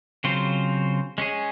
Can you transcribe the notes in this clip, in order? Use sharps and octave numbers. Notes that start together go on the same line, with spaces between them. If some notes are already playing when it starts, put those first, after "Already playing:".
C#3 F#3 C4 F4 C5
G#3 C#4 G#4